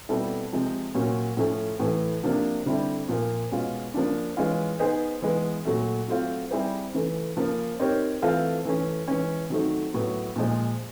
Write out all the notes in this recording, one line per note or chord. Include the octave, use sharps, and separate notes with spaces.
B2 G3 C4 E4 A4
C3 F3 G#3 C4
A#2 F#3 A#3 C#4
A2 F3 A3 C#4
A2 E3 A3
C3 F3 A#3 D4
D3 G3 C4 E4 A4
A#2 F3 A#3
B2 G#3 C#4 F4
C#3 F3 A#3 D4
E3 G#3 C#4 F4
B3 D#4 G#4 C5
E3 G#3 B3
A#2 F#3 A3
F#3 A3 C4 F4
G3 C4 E4 G#4 C5
C#3 E3 A3
C#3 F3 A#3
C4 D#4 G4 A#4 C#5
E3 A3 C4 F4 A4
E3 A3 C#4
E3 G#3 C#4
D#3 F#3 A3 C4
A2 F#3 B3
A#2 F3 G#3